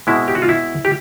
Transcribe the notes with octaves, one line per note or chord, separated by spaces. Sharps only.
B2 G#3 C4 E4
G4
F#4
F4
E4
G4